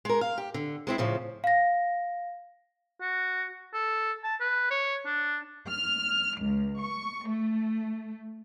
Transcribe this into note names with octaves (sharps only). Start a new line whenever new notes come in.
G#3 A#4
F5
G4
D3
G#3 C4 E4
A2 C#3 F3
F5 A#6
F#4
A4
A5
B4
C#5
D4
F6
C#2
C#6
A3